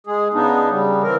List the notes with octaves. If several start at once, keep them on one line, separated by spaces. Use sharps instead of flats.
G#3 G#4
C#3 B3 D4 D#4
C#3 G3
E3 C4 A#4